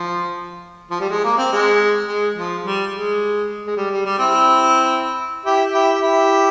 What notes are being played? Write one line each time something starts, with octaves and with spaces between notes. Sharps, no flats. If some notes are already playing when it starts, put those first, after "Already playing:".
Already playing: F3
F3
G3
G#3
A#3
C4
G#3
G#3
F3
G3
G#3
G#3
G3
G3
G3
C4 E4
E4 G4
E4 G4
E4 G4